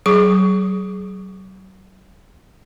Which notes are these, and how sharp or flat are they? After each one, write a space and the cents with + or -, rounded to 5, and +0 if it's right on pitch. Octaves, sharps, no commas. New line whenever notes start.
F#3 +40 G#4 +15 C#6 +25